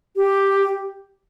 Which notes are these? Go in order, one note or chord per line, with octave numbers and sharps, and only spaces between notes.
G4